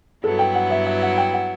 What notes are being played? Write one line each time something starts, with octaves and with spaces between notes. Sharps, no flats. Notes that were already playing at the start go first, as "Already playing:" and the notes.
G2 F#3 B3 E4 A4
G5
F#5
E5
E5
F#5
G5
F#5